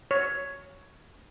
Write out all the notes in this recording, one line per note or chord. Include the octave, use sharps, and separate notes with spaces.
C#5